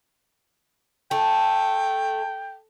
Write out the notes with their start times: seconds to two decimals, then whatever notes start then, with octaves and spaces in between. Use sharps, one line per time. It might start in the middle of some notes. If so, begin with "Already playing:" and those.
1.11 A3 G5